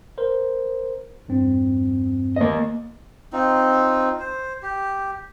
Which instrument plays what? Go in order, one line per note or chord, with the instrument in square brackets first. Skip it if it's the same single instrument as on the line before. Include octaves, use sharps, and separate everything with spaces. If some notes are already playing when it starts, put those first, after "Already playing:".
[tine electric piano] A#4 C5
E2 G2 C4
[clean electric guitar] A#3 D#5
[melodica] C4 D#4 F4
C5
G4